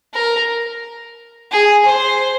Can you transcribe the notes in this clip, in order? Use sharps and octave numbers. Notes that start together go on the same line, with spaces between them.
A#4
G#4
C5